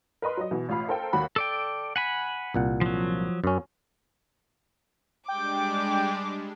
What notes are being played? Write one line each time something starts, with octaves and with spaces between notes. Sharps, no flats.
A#4 B4 D#5 C6
F#3 D#5
B2 E3
A1 F4 F5 B5
A4 A#4 C5 F5 G5
D#2 F#4 B5
A4 D5 G5
F#5 G#5 B5
C2 A#2 F#5
F3 F#3
F#2 C#4
G3 G#3 D4 G5 D6